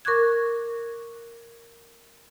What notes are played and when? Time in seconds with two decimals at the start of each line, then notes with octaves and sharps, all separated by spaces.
0.05 A#4 C#6 D6 F#6 G#6